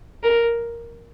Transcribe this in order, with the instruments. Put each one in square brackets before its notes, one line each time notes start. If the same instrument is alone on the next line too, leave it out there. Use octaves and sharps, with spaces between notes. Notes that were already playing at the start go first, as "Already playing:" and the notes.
[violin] A#4